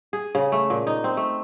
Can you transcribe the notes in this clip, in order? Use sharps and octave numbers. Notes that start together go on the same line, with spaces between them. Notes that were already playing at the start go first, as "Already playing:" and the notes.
G#4
C#3
A3
A#2
D#4
C4
A3